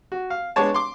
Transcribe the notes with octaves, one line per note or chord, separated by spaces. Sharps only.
F#4
F5
G#3 B3 D4 C#5 A5
C6 D6